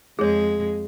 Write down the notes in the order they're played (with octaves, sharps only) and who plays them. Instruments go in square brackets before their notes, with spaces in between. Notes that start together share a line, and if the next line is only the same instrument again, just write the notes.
[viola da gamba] F2 G#3 [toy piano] G#4 C#5